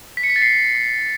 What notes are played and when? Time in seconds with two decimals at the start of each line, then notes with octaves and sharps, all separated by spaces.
0.17 B6
0.23 C#7
0.30 B6
0.36 A6
0.42 C7